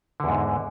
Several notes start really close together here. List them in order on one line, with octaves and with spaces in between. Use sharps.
D3 E2 G#2